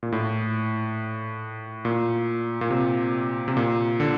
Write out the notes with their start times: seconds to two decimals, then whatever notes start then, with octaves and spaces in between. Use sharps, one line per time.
0.03 A#2
0.12 A2
1.85 A#2
2.61 A#2
2.70 C3
3.48 C3
3.57 A#2
4.00 D3